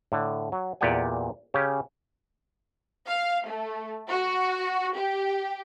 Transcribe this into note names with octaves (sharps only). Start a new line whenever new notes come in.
A2 D3
F#3
E2 A#2 G4 D5 F#5 G#5
C#3 C#4 G4
F5
A3
F#4
G4